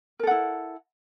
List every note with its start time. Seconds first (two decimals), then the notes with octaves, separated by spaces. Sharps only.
0.19 A#4
0.23 A4
0.27 F#5
0.31 E4